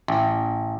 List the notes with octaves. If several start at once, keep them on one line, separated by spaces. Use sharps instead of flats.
A1